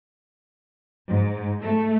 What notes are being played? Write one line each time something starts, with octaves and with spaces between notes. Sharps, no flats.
G#2
A3